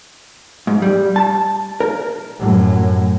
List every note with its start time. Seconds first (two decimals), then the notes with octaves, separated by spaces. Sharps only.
0.67 G#2
0.82 G3
1.16 A5
1.80 A#4
2.39 F#2 A2